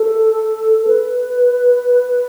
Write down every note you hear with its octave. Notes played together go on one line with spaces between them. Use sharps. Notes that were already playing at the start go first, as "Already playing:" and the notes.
Already playing: A4
B4